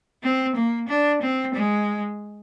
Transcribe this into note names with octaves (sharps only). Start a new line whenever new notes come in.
C4
A#3
D4
C4
G#3